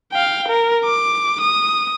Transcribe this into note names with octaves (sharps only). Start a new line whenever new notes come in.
F5 G5
A#4
D6
D#6